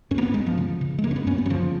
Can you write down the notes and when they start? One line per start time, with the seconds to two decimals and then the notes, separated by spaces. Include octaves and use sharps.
0.11 F#2 C#4
0.18 A#3
0.23 B3
0.34 F#2 G#3
0.47 F3
0.58 C#3
0.81 C#3
0.98 G#3
1.04 F#2 A#3
1.11 C#4
1.16 B3
1.27 F#2 C#4
1.38 B3
1.46 F#3
1.50 C#3 F3